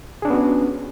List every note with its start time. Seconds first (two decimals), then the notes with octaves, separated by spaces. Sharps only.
0.22 G#4
0.25 D4
0.28 C#4
0.30 B3
0.33 F#4